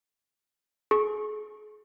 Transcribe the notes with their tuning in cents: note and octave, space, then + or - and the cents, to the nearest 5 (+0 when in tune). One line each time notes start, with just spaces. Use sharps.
G#4 +35 C#6 -20